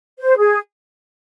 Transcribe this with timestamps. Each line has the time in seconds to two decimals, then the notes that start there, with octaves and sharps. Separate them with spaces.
0.19 C5
0.38 G#4